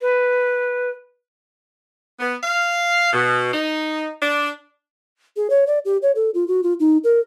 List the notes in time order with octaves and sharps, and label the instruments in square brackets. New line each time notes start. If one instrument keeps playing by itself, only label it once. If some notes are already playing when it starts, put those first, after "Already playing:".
[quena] B4
[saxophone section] B3
F5
B2
D#4
D4
[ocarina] G#4
C#5
D5
G4
C#5
A4
F4
F#4
F4
D#4
A#4